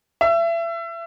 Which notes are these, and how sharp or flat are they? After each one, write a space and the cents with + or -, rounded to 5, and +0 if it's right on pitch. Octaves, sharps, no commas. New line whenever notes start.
E5 +30